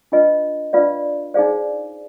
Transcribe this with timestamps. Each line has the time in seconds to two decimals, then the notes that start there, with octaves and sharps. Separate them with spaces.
0.12 D4 F4 B4 D#5
0.73 D4 F4 B4 D5 F5
1.34 D#4 G#4 C5 D5 F5